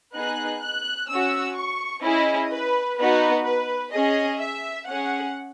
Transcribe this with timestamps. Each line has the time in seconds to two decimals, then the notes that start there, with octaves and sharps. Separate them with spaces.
0.13 B3 D#4 G#4 F#6
0.61 F#6
1.09 C#4 F#4 E6
1.55 C#6
2.03 C#4 E4 G#4 D#5
2.50 B4
2.98 B3 D#4 F#4 B4
3.45 B4
3.93 C#4 G#4 D#5
4.39 E5
4.87 C#4 G#4 F#5